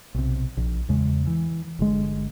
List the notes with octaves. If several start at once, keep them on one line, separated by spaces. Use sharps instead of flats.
B1 C3
A#1
E2 C#3 G#3
E3
G1 D3 G#3